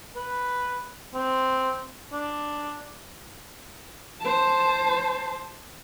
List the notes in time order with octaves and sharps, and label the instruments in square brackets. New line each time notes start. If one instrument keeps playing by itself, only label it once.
[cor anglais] B4
C4
D4
[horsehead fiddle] C5 A5